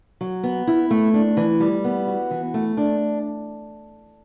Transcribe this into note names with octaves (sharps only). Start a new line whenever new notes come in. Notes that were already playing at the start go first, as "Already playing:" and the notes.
F#3
B3
E4
A3
D4
E3
G3
B3
F#4
E3
A3
D4